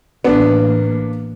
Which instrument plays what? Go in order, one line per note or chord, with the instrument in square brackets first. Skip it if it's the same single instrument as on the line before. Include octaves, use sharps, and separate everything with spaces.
[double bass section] A1 A2 A#3 [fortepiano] B3 D4